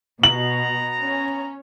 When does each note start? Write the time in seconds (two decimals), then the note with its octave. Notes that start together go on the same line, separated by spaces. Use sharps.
0.23 B2 B3 A#5 F#7
1.00 C#4